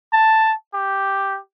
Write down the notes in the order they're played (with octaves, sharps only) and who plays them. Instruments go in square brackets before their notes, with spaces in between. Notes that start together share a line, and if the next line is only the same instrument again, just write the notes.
[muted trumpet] A5
G4